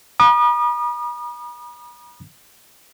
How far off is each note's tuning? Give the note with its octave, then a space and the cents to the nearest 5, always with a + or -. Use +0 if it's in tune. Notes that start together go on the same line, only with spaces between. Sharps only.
B5 -45 D#6 -40